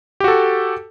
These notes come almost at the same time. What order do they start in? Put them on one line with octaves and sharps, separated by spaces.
G4 F#4 A4